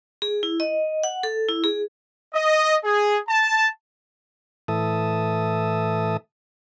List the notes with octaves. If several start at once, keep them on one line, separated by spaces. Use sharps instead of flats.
G#4
E4
D#5
F#5
A4
E4
G#4
D#5
G#4
A5
A2 E3 A4 E5 A5 D#6